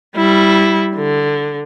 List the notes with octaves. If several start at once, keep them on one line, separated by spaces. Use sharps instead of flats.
G3 E4
D3